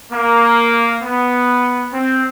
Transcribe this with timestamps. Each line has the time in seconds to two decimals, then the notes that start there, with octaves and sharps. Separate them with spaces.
0.12 A#3
1.02 B3
1.93 C4